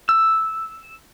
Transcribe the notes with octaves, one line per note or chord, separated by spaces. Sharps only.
E6